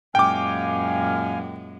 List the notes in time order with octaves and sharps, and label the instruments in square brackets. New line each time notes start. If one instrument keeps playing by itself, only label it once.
[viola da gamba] F#2 A#2 G#3 [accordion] F5 G#5 F6 [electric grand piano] G5 D6